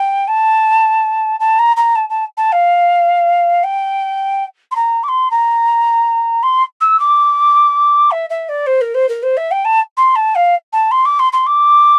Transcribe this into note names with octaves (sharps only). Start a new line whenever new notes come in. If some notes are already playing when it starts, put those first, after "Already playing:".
Already playing: G5
A5
A5
A#5
A#5
A5
A5
A5
F5
G5
C6
A#5
D6
C6
A#5
C6
E6
D6
E5
E5
D5
C5
A#4
C5
A#4
C5
E5
G5
A5
C6
A5
F5
A5
C6
D6
C6
C6
D6